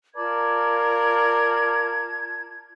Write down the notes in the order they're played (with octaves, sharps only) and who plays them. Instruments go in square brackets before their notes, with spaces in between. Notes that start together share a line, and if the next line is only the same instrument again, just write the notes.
[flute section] F4 A5 G#6 [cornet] A#4 [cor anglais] D5